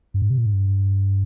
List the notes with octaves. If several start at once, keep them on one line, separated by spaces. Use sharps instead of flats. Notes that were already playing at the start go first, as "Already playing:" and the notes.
G2
G#2
C3
A#2
G#2
G2